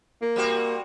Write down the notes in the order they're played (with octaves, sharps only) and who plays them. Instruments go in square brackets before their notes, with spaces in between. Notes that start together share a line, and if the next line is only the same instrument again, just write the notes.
[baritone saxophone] A#3
[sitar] G3 C4 F#4